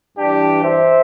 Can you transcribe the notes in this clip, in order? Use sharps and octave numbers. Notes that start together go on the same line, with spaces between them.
G2 E3 D4 G4
C5 E5